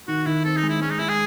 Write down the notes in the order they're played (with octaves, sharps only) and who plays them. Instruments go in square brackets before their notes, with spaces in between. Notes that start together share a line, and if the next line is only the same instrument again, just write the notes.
[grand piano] D#3 [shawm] F#4
[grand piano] D#3 [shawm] E4
[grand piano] C4 [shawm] A4
[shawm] D#4
[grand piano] G#3
[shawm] E4
[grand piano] G#3 [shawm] C#4
[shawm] D#4
[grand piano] G#3 [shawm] E4
[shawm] G#4